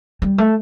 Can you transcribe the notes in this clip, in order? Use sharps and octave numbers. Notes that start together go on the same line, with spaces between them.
G3
A3